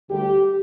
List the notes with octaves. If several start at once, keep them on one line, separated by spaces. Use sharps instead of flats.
D2 D3 G3 G4